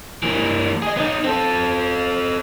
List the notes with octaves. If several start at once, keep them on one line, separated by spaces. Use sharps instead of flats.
E3 A#3
G#4 D#5
B3 D#4
C4 A4